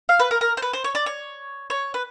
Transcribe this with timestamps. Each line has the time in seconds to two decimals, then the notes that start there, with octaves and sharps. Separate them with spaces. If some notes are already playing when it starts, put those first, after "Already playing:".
0.09 F5
0.19 B4
0.31 A#4
0.41 A#4
0.57 C5
0.62 B4
0.73 C5
0.84 C#5
0.95 D5
1.06 C#5
1.70 C#5
1.94 B4